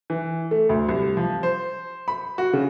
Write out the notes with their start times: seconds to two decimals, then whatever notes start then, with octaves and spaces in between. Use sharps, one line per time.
0.10 E3
0.51 A3
0.69 D2
0.89 C2
1.17 F3
1.43 C5
2.08 B5
2.38 F#4
2.53 C#3